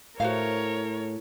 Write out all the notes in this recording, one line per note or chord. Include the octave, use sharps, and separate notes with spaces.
A2 F#4 A#4 C5 C#5 F5